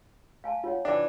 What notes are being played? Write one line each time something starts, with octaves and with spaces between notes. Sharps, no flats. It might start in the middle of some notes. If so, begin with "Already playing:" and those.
F5 G#5 A5
F4 C#5 F#5
E3 D4